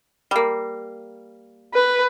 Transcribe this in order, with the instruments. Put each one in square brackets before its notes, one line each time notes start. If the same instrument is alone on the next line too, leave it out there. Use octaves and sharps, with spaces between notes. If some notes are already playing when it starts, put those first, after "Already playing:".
[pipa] G3 A#3
[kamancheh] B4